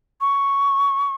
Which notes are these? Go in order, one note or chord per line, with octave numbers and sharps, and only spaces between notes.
C#6